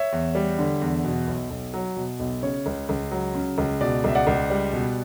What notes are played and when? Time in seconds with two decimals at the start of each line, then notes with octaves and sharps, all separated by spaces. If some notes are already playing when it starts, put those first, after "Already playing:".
Already playing: C#5 E5
0.12 E2
0.35 G3
0.59 D3
0.81 E2
1.04 B2
1.27 B1
1.51 B1
1.74 F#3
1.96 B2
2.19 B1
2.42 C#3 C#5
2.66 C#2
2.89 C#2
3.11 F#3
3.35 C#3
3.58 C#2
3.81 B2 D5
4.04 C#2 E5
4.15 D5 F#5
4.27 C#2
4.50 G3
4.73 B2